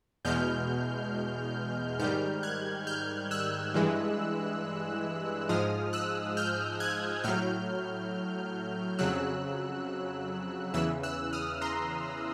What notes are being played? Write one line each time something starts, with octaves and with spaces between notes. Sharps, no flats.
E2 B2 G#3 F6 G6
G#2 D#3 G3 F6 G6
F#6 G#6
F6 G6
E6 F#6
G2 E3 G#3
G#2 F3 G#3 D#6 F6
E6 F#6
F6 G6
F#6 G#6
A2 F#3 F6 G6
F2 C#3 F#3 E6 F#6
E2 C#3 E3 E6 F#6
E6 F#6
D#6 F6
A#5 C6